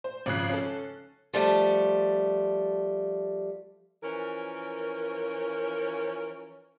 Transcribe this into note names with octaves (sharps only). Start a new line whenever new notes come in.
C5
G#1 C#3 F3 F#6 C7
C#4 A4
F3 G3 A3
E3 F3 C#4 A#4